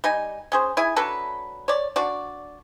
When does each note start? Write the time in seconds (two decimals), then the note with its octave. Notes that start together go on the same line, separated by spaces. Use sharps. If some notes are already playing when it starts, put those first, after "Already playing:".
0.04 G3 D#4 G#5
0.52 C#4 G#4 C5
0.77 E4 G#4 G#5
0.96 F#3 D4 A4 B4
1.68 C#5 D5
1.96 D4 F#4 D5